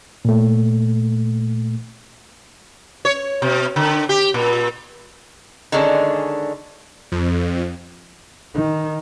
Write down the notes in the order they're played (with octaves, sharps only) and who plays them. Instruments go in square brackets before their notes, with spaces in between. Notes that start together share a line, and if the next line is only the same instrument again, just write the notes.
[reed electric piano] A#2 A3
[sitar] C#5
B2
D3
G4
A#2
[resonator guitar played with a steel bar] D3 D#3 G#3 C#4 D4
[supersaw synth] F2
[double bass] D#3